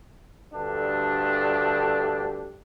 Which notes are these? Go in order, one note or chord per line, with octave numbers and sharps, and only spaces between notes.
D2 G2 A3 D4 G4 A4